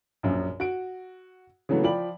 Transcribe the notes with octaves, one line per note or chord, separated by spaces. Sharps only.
A#1 F#2
F#4 D7
C#3 E3 F#3 A3 B3
F3 D5 G5 B5 F#7